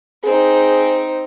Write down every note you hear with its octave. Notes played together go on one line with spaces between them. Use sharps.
C4 D#4 G#4